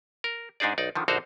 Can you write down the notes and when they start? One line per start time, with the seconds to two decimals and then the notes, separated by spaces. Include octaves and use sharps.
0.24 A#4
0.60 G#2 D4 D#4 G#4 D5
0.78 B1 D#4 D5
0.95 D3 D#3 F3
1.08 A#1 D3 D#4 F#4 C5 F5